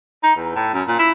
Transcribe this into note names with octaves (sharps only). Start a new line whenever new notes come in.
D#4
E2
A2
F#2
A#2
E4